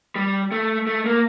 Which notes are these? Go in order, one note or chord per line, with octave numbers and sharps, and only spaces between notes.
G3
A3
A3
A#3